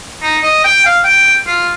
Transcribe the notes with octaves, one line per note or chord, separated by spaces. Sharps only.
D#4
D#5
G5
F5
G5
F4